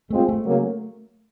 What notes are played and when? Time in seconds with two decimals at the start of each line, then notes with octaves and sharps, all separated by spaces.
0.10 G#3 A3 C4 F4
0.29 A3
0.45 C#3 F#3 A#3